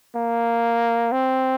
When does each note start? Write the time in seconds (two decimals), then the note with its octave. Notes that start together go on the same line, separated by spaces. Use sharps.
0.16 A#3
1.12 C4